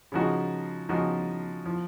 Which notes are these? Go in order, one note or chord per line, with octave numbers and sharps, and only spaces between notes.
C#3 F3 G#3 D#4 F#4
C#3 F3 G#3 D#4 F#4
F3